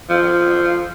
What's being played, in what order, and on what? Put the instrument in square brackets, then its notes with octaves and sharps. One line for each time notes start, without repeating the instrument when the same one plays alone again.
[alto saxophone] F3